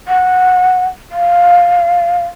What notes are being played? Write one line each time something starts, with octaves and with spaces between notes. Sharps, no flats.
F#5
F5